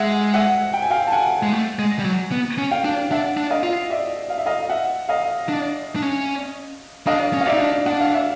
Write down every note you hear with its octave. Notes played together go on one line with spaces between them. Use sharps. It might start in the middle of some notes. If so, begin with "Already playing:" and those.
Already playing: G#3 E5 F#5
E5 F#5
G5
G#5
F5 G5
A5
F#5 G#5
G#3
A3
G#3
G3
F#3
B3
C#4
F5 G5
D4
D4 E5 F#5
D4
D#5 F5
F4
D5 E5
F5
E5
D#5 F5
E5 F#5
D#5 F5
D4
D4
C#4
D4 D#5 F5
C#4
F5
D5 E5
D#4
D4
D4 F#5
F5
E5